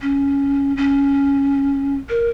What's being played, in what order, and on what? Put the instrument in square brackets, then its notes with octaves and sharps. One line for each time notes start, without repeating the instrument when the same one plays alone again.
[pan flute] C#4
C#4
A#4